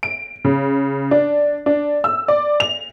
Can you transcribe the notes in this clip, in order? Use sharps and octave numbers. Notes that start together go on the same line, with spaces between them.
D7
C#3
D4
D4
E6
D5
F7